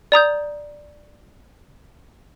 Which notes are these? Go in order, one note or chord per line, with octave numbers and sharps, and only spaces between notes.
D5 A#5 D#6 G6